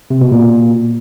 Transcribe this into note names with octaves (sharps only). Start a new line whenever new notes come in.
C3
B2
A#2